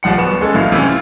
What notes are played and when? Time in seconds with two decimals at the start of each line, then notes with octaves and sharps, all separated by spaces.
0.03 D#1 C2 F3 F#5 C#7
0.17 D1 B3 E7
0.41 G#3 C#4 A4
0.54 A#1 A2 F#3 E4 F5
0.72 C3 E3 C#4
0.87 F4